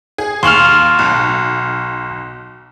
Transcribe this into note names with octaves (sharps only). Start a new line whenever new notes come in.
G#4
D#2 F5 C6 C#6 F6 F#7
B1